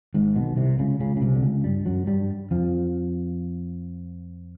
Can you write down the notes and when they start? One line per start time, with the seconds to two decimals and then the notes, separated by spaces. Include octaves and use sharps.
0.14 G#1 G#2
0.36 B1 B2
0.57 C2 C3
0.79 C#2 C#3
1.00 C#2 C#3
1.16 C#3
1.22 C2 C3
1.35 D3
1.43 C#2 C#3
1.64 G2 G3
1.86 F#2 F#3
2.07 G2 G3
2.51 F2 F3